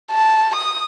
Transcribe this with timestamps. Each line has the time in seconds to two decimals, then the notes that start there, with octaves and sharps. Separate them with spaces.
0.12 A5
0.56 D#6